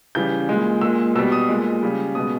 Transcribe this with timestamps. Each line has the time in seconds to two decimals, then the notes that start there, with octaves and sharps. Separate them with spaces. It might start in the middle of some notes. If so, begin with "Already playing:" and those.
0.15 C#3 E3 G3 G6
0.49 A#2 G#3
0.81 A#2 G#3 E6
1.15 B2 G3 E6
1.32 D#6
1.49 A#2 G#3
1.83 C#3 G3
2.15 B2 G#3 D#6